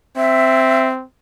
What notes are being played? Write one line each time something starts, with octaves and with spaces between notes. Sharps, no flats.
C4 E5